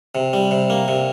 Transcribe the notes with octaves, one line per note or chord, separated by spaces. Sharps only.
C3
G3
C3
A#3
C3